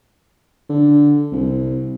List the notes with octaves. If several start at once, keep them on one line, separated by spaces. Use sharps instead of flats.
D3
C2